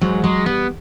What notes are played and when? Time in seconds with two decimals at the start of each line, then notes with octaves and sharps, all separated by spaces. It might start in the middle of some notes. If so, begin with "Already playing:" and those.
0.01 G#2 F#3
0.24 F#3 G#3
0.46 G3 B3